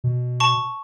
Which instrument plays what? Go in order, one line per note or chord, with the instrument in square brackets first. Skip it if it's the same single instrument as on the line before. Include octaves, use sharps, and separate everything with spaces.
[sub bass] B2
[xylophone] A5 C#6